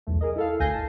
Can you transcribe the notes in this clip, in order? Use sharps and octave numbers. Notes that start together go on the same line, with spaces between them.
B1 E2 A3
G#4 A#4 D#5
E4 A4 F5
G#1 D2 G#5 G6 A#6 C7
A5